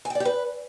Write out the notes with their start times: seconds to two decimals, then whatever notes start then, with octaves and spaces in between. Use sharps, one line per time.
0.05 G#5
0.10 G5
0.15 D5
0.20 G4
0.25 B4